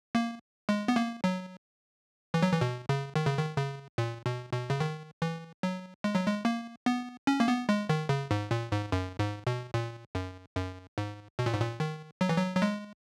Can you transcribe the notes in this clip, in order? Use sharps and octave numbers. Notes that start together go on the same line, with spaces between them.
A#3
G#3
B3
A#3
F#3
E3
F#3
E3
B2
C#3
D#3
C#3
D#3
C#3
A#2
B2
B2
C#3
D#3
E3
F#3
G#3
F#3
G#3
A#3
B3
C#4
A#3
B3
G#3
D#3
C#3
G#2
A#2
G#2
F#2
G#2
B2
A#2
F#2
F#2
G#2
B2
A#2
G#2
A#2
D#3
F#3
E3
F#3
F#3
G#3